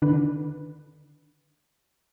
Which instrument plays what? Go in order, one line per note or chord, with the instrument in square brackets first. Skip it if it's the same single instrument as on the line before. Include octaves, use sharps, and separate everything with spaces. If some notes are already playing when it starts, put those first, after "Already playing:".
[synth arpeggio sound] D3 D#3 D4 B4